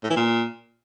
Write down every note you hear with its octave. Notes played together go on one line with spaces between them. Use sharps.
A2
E3
A#2